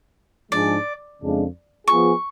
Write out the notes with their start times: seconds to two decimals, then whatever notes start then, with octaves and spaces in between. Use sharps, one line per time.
0.52 G#2 F3 G#3 D4 G#4 D5
1.20 F2 C#3 G#3 D4 F4
1.88 F3 B3 F4 G#4 C#6